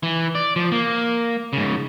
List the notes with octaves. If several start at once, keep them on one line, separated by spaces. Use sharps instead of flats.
E3
D5
F3
A#3
G#2 C#3